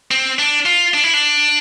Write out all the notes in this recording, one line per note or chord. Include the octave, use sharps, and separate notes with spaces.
C4
D4
F4
D4
E4
D4